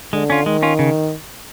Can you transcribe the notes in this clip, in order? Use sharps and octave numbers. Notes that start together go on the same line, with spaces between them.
D3 G#3
C#4 F4
D#3 G#3
C#4 F4
C#3